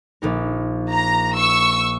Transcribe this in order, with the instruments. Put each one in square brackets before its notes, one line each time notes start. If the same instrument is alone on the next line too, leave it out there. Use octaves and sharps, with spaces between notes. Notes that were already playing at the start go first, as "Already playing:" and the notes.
[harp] A#1 D#4 A#4
[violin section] A#5
C#6 E6